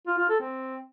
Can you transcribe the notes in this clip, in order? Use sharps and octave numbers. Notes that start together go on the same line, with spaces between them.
F4
F4
A4
C4